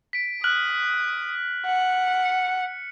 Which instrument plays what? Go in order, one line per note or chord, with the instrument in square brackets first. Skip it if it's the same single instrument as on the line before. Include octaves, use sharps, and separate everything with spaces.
[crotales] B6 D7
[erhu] D#6 [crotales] F6 F#6 F#7
[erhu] F#5
[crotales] C#7